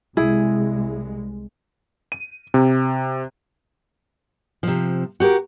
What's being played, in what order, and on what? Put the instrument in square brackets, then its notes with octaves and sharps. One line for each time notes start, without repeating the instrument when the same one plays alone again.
[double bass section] C2 G#3 [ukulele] E4 G#4
[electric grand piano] D#7
C3
[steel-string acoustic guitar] C3 F3
F#4 G4 A#4